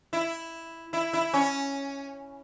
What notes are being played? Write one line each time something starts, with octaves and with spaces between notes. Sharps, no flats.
E4
E4
E4
C#4